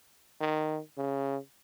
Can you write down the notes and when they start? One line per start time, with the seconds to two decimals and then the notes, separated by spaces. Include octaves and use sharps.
0.40 D#3
0.98 C#3